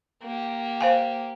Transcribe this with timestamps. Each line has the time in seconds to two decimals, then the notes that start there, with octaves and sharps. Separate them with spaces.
0.23 A#3 G4
0.81 C5 F5 G#5